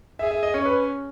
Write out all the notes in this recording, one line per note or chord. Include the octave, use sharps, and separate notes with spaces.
G#4 E5
E5
D#5
C#4 C#5
B4